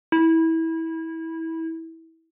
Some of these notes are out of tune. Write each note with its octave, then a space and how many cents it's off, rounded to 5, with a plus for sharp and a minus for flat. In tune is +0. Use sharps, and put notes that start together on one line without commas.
E4 -20